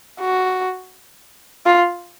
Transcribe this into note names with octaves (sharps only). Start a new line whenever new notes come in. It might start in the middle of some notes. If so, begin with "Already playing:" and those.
F#4
F4